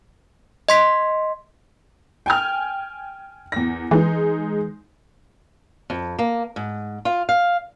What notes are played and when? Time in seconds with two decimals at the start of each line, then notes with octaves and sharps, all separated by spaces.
0.69 D#5 C6 B6
2.26 G5 G#5 F6
3.52 E2 A#6
3.91 E3 G#3 D#4
5.90 F2
6.19 A#3
6.56 G#2
7.05 F4
7.29 F5